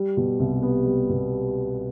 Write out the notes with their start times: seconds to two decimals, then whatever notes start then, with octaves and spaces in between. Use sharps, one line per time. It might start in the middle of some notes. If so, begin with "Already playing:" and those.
Already playing: G3
0.17 B2
0.40 C2
0.63 B3
0.86 G3
1.09 B2